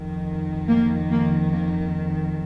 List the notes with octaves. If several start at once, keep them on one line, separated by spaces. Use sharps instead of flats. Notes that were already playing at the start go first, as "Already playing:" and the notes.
Already playing: F2 D#3
A#3
A#3
A#3